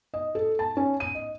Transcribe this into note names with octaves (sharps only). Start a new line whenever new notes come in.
D#5
A4
A5
C#4
D#7
D#5